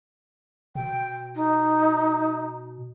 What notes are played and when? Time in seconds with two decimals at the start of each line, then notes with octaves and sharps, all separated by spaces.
0.75 B2 G5
1.35 D#4